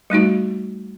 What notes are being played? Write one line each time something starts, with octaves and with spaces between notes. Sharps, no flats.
G3 A3 D#4 F#4